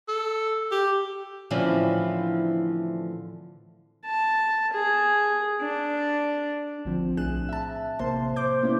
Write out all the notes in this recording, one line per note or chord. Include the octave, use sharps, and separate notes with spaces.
A4
G4
A2 D3 E3 F3 C4 C#4
A5
G#4
D4
A1 D3 F3 C4
B1 A2 D4 G#4 F#6 E7
E5 A5
A1 C3 A#3 C5 A5 C6
C5 D6 G6
G#3 A#3 B3 C#4 D4 E4